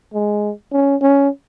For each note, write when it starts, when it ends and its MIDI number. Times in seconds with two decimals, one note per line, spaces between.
0.14 0.51 56
0.72 0.96 61
1.02 1.29 61